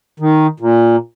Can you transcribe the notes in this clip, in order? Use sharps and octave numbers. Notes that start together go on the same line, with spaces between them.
D#3
A#2